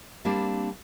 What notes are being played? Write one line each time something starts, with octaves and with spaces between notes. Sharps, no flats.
G3 A#3 C4 D4